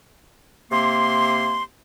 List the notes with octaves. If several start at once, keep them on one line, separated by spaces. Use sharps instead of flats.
C3 A#3 C6